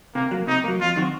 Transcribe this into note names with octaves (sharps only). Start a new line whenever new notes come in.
C3 A#3
F#3 A#3
C3 D#4
F#3 A#3
F2 F4
D#3 F#3 C4 F#4